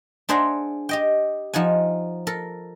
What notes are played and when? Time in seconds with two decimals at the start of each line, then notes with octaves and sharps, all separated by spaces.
0.29 D4 G#4 C5 E5 F#5 A#5
0.89 G4 D#5 G5
1.54 F3 D#4 F#5 G#5
2.27 A4 A#4